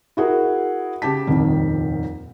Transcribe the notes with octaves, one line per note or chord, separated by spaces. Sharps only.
E4 F#4 G#4 A#4
C#3 G4 A5 B6
D#1 C2 F2 D#3